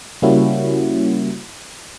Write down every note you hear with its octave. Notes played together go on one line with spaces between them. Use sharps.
C#3 G3 A#3 C#4 E4 F#4